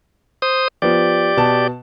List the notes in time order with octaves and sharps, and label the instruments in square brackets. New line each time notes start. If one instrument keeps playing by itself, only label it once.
[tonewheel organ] C5 D#6
[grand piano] F3 B3 [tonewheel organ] G4 D5
[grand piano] B2 A5